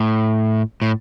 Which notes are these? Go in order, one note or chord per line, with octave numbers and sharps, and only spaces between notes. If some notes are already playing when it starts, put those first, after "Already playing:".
Already playing: A2
A2